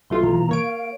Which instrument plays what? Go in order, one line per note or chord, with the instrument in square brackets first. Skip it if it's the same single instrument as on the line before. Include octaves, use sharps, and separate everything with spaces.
[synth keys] B1 A3 F4 [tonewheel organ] C6
[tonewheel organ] B2 E3 A#5
[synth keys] A#3 C#5 D7
[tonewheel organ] F5